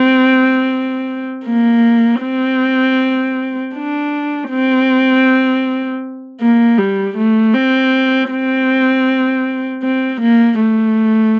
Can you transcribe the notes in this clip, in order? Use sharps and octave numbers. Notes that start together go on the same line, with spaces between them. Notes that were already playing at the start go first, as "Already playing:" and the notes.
Already playing: C4
A#3
C4
D4
C4
A#3
G3
A3
C4
C4
C4
A#3
A3